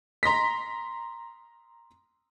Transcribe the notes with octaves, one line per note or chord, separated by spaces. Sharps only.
A#5 C6 A#6 B6